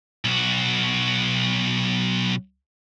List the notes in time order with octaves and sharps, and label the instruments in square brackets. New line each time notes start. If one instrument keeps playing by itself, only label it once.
[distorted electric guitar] B1 F#4